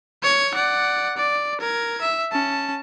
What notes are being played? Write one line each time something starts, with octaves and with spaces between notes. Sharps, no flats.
C#5 G#6
D5 F#5
D5
A#4 G#6
E5
C#4 A5